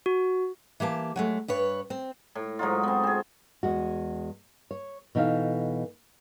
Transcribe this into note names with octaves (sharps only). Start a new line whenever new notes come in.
F#4
E3 A#3 G4 A5
F#3 G#3 A3
G2 B4 C#5
C4
A2
G#2 F#3 D#4 F4
B3 C4
C4 G#4
E2 G#3 F#4
C#5
B2 E3 D#4 A4 F5